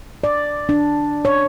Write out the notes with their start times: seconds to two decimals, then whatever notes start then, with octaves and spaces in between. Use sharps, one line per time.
0.24 D5
0.69 D4
1.25 C#5